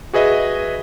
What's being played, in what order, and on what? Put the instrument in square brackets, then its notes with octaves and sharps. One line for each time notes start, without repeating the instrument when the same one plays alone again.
[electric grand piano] F#4 G#4 B4 D#5 E5